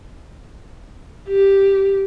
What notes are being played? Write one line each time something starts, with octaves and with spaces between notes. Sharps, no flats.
G4